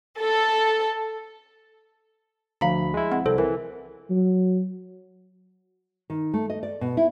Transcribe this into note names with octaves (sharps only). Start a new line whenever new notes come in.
A4
D2 F3 F5 A#5 B5
G#3 E4
C4 F#5
C2 A4 C5
E3 A#4
F#3
D#3
A3
D#5
D5
B2
E4